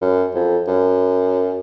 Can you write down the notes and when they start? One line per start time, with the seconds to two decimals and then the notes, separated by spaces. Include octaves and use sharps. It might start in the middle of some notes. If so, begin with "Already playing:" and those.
0.02 F#2
0.35 F2
0.67 F#2